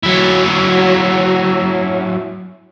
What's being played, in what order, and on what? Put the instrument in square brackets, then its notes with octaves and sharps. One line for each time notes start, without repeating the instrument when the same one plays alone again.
[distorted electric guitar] F#3 E4